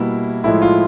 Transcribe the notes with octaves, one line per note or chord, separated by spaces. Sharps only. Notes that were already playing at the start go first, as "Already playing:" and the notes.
Already playing: B2 G3 A#3 E4
A2 F3 G#3 E4
F4